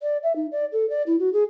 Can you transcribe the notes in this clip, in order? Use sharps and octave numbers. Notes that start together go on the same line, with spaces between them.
D5
E5
D#4
D5
A4
D5
E4
F#4
G#4